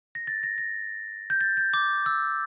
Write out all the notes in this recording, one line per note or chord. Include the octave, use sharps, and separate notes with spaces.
A#6
A6
A#6
A#6
G6
A6
G6
D6
E6